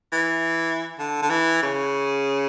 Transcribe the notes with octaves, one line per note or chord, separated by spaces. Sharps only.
E3
D3
D3
E3
C#3